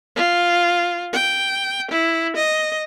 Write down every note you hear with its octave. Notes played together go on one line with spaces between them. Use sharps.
F4
G5
E4
D#5